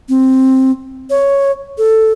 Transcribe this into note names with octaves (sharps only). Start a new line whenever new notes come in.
C4
C#5
A4